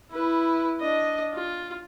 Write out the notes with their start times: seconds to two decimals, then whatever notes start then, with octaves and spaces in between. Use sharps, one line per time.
0.11 E4 B4
0.81 D4 D#5
1.34 F4